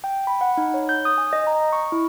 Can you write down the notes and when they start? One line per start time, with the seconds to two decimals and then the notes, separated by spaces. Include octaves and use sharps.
0.04 G5
0.27 B5
0.41 F#5
0.57 D#4
0.74 C#5
0.89 G6
1.05 D#6
1.18 G#5
1.33 D#5
1.47 A#5
1.73 C#6
1.92 E4